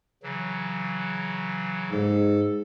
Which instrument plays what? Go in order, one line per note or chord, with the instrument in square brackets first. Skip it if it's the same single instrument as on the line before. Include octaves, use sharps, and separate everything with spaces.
[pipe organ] C#3 E3 F#3
[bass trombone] G#2 [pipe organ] A4